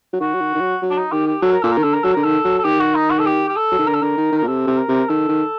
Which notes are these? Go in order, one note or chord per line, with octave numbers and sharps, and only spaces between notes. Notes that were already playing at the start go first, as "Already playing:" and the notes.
F#3
D#3 F#4
F#3
D#3
D#3
F#3
F#3
D4
D#4
D#3 G4
G4
F#3 A4
A#4
A#2 A4
A#4
D#3
D3 A4
A#4
F#3 A4
D3 A#4
D#3 A4
F#3
A4
D#3 G4
F#4
D#4
F#4
A4
G4
G4
A4
F#3
D#3
D3 A#4
A4
D3 A#4
D#3
D#3
A#4
A#2
C3 A4
C3
A#4
C3
D#3 A4
D#3